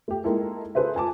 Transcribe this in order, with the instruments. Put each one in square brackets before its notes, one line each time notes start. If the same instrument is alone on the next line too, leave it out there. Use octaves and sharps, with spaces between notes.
[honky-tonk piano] A3 G4
G#3 A#3 D#4 E4 A4
G#4 A4 B4 C5 E5
F4 G#5 A5 D6